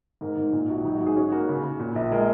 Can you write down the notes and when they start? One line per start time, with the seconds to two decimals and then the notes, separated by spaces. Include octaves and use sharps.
0.21 G#2 A#4
0.37 G#2
0.53 A#2
0.70 A#1 F#4
0.84 F#3 D#4
0.95 F#4
1.00 G#2
1.06 G#4
1.16 C#4 F#4
1.32 A#3 F#4
1.49 C#3
1.64 C#3
1.80 A#2
1.96 A#1
2.12 G#3 A#4